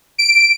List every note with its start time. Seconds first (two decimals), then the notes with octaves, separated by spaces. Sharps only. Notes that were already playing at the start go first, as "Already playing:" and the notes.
0.18 D7